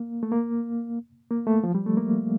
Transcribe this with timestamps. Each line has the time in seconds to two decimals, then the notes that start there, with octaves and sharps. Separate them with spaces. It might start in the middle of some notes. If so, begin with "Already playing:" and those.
Already playing: A#3
0.23 A3
0.32 A#3
1.31 A#3
1.47 A3
1.64 F3
1.75 G3
1.86 A3
1.97 A#3